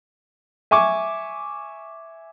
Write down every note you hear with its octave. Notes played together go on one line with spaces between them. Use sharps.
E5 G#5 C#6 D6